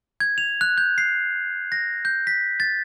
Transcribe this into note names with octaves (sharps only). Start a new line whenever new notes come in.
G#6
F7
F#6
G6
C7
A#6
G6
B6
A6